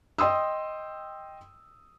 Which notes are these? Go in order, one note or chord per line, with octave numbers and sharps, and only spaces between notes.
D#5 G5 C6 D#6 E6